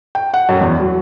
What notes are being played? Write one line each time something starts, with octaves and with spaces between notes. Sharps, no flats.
G5
F#5
F#2
E2
F#3